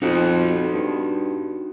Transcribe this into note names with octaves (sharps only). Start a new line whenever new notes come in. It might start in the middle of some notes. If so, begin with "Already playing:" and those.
F2 D#4 F#4
G2